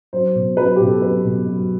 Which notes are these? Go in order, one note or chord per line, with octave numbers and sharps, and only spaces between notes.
F#3 C5
B2
F#3 B4
B2 G4
A4
F#3 B4
B2
F#3